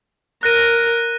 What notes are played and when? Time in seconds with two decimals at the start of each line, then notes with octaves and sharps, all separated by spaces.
0.43 A#4 F#6 A#6 D#7